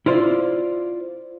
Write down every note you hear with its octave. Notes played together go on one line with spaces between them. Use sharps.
E4 F4 C5 D5